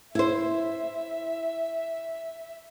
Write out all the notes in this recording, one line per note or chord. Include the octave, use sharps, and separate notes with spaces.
E4 C5 E5